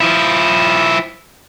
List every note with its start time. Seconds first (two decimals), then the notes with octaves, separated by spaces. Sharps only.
0.01 F3 E4